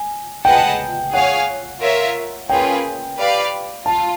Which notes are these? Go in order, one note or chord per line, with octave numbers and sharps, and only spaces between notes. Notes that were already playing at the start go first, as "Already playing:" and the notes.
Already playing: G#5
G#4 B4 D#5 F#5 G5 A5
G#4 C#5 F5 F#5 G#5
F4 A#4 C#5 E5
A#3 C#4 F4 G#4 B4 G5
G4 B4 D5 F5
F4 A5